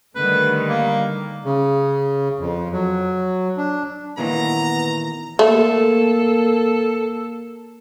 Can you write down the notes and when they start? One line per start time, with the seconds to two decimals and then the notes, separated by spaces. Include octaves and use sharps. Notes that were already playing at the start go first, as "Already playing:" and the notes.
0.16 D3 D#3 G3 A3 B4
0.69 A#3
1.45 C#3
2.39 F2
2.72 F#3
3.57 D4
4.18 A#2 D#3 E3 B3 A#5
5.39 A3 A#3 A4